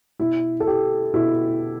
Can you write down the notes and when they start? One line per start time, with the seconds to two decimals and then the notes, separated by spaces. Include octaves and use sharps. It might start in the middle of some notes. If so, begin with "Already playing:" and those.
0.19 B2 E4
0.60 A4
0.67 G4
1.14 B2 E4